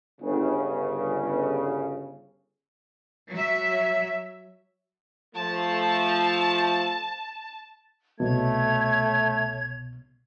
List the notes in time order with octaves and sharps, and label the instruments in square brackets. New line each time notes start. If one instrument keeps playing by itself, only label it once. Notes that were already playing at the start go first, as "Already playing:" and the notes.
[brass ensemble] G1 C#3
[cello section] F#3 E5
[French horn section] F3 A3 [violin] A5
[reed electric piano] C2 B2 [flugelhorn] A3 [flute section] C#5 G#6